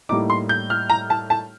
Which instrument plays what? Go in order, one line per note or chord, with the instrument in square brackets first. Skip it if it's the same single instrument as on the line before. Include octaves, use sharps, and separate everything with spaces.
[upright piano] A2 G3 A#3 D#4 D6
C6
G6
F6
A#5
A5
A5